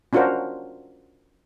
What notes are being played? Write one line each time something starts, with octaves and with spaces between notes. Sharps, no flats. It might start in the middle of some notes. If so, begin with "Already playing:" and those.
C#4 D4 F4 F#4 A#4 C5